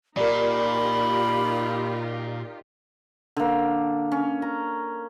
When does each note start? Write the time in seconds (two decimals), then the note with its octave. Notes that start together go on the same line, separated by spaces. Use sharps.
0.17 A#2 D#4 F4 G4 A#4 D5 B5
3.37 D3 A#3
4.12 C#4
4.42 A#5